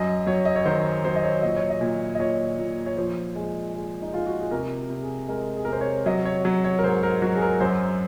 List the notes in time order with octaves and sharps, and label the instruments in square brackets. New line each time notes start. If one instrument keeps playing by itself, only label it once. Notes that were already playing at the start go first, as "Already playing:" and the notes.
Already playing: [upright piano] F#2 D#5
F#3 C#5
D#5
C#5
D#3 C5
F#3 C5
D#5
C#5
A#2 D#5
C#5
D#5
A#2
D#5
A#2 C#5
A#2
C#5
F3 C5
G#3
G#3
D#4
G#3 F4
F#4
G#4
C3 A#4
C3
G#4
G#3 A#4
G#4
A#4
C3 C5
C#5
F#3 D#5
C#5
F#3 C#5
C#5
A#4
G#2 C5
A#4
F#3 F#4
G#4
A#4
F#2 C5